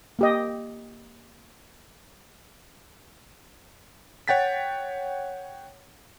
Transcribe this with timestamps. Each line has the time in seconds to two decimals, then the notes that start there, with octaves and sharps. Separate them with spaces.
0.19 A#3 G4 D#5
4.28 C#5 F#5 G5 A6 B6